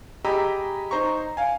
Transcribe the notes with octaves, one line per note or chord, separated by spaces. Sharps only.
G4 G#4 D#5 A#5 B5 E6
D#4 C5 A#5 C#6
F5 G#5